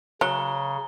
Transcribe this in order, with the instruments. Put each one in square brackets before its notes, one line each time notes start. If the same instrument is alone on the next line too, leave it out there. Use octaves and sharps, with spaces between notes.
[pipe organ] C#3 [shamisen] F#3 [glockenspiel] A#5 G7